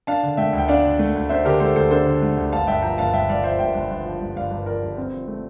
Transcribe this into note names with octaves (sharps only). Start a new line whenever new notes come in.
D4 F5 A5
D3
A3 E5 G5
D2
G5
D4 D5 F5
D3
A3
D2
D4 C5 E5
D3 G4 A#4
A3 A4 C5
D2 A4 C5
D4 A4 C5
D3
A3
D2
G1 F5 A5
G2 E5 G5
F3 G5 A#5
G1 F5 A5
G1 E5 G5
G2 D5 F5
F3 C5 E5
G1 E5 G5
G1
G2
F3
G1
G1 D5 F5
G2
F3 A#4 D5
G1
C4
F3
A3